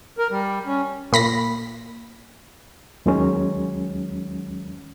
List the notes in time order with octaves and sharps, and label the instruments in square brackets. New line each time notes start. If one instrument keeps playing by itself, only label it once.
[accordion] A#4
G3
C#4
[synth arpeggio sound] A#2 B5 A#6 B6
[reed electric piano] D#2 D#3 F#3 G#3 C#4